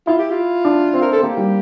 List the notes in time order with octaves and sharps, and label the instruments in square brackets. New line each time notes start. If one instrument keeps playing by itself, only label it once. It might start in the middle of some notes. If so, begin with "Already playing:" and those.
[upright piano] E4 [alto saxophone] F4
[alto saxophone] G4
F4
[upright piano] D4
C4
[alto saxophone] A#4
[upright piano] C4 [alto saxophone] A4
[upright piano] A#3 [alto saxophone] G4
[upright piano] G3